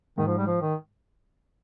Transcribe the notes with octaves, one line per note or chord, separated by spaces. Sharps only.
G#2 D#3
F3
G3
F3
D#3